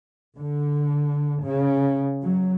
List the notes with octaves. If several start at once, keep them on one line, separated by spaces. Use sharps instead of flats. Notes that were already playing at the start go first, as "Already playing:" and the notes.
D3
C#3
F#3